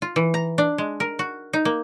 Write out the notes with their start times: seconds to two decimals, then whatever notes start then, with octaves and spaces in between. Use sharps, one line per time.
0.02 F4
0.16 E3
0.34 A#5
0.58 D4
0.78 G#3
1.00 A#4
1.19 F#4
1.53 D#4
1.65 A#3